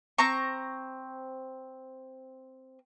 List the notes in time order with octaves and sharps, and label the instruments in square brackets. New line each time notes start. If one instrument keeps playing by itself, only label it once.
[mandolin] C4 A#5 C#6